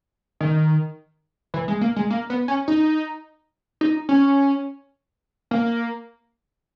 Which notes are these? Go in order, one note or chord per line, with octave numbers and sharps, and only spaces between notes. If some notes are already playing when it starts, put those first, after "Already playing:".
D#3
E3
G#3
A#3
G#3
A#3
B3
C#4
D#4
D#4
C#4
A#3